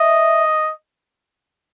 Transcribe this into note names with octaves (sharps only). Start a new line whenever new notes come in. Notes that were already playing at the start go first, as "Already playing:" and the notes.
Already playing: D#5 E5